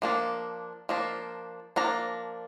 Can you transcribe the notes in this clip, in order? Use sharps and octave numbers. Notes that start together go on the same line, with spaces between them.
F3 A#3 D4
F3 A#3 D4
F3 A#3 D4 A#5